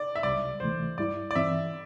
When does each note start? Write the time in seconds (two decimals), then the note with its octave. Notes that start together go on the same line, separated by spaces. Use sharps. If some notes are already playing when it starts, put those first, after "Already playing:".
Already playing: D5
0.15 E5
0.23 C2 C3 G3 D5
0.60 D2 C3 E3 A3 C5
0.98 G2 G3 E4 D5
1.31 D5
1.35 G2 E3 C4 E5